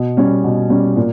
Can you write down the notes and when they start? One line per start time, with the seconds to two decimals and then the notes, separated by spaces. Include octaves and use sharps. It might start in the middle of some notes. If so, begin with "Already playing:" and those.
Already playing: B2
0.17 G3 C#4
0.44 B2
0.70 G3 C#4
0.96 A#2